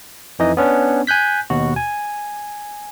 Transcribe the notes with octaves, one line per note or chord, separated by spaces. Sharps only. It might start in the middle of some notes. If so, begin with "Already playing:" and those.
F2 E3 D#4 D#5
B3 C#4 D4
G#5 F#6 G6 B6
D#2 B2 F#4
G#5